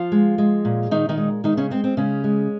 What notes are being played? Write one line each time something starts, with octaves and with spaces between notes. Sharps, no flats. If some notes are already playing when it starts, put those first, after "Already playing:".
Already playing: F3 F4
G#3
G#3
A#2
A#2 D#3 D#4
D#3 D#4
G#3
D#3 G#3 D#4
C#3 C#4
G#3 C4
C4
C#3 G#3 C#4
G#3